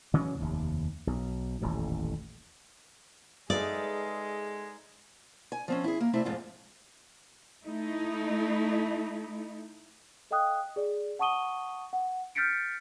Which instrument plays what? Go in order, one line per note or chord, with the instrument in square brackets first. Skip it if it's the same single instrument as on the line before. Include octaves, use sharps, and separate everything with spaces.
[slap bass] C#3 E3 F#3 C#4
F1 D#2
B1
D#1 A1 F2
[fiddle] G#3 [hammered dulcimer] D#4 B4 F5 [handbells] G#4 A4 E5 [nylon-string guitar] D5
[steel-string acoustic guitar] G#5
F3 C4 C#4
E4 G#4
A#3
C3 A3 C4 D4 E4
F2 G#2 F4
[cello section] A3 D#4 E4
[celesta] A4 D#5 F5 G5 D#6 F#6
G#4 D5
F#5 A5 C#6 D#6 D#7 G7
F#5
F6 G6 A6 B6 C#7 D7